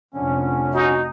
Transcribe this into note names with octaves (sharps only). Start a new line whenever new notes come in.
F1 D3 C#4
D#4 F#4